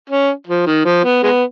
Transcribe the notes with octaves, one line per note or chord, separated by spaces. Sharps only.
C#4
F3
D#3
F3
B3
G#3 B3